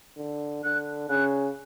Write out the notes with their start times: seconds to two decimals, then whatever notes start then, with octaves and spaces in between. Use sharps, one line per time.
0.17 D3
0.64 D3 F#6
1.09 C#3 F#6